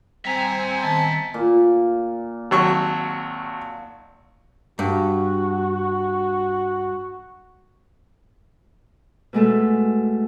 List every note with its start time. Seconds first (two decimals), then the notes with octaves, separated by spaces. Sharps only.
0.25 G3 C4 E5 G#5 A#5
0.82 D#3 B3 A5
1.34 A#2
2.51 G#1 F#3 C#6
4.79 G2 F#4
9.33 B2 G#3 A3 A4